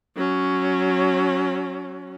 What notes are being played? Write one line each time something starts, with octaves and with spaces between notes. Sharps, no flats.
F#3 C#4